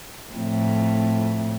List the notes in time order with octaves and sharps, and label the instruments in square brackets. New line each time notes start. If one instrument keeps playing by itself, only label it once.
[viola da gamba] F2 A2